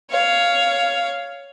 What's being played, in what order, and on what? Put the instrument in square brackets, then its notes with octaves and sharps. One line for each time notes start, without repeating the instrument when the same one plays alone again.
[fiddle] C#5 F5